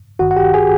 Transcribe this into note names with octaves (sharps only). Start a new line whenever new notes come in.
G#1 G2 D#3 F#4 F#5
F#5
G4 G5
G#4 G#5